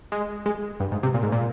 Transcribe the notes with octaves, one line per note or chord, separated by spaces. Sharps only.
G#3
G#3
G2
G#2
C3
A#2
G#2
A#2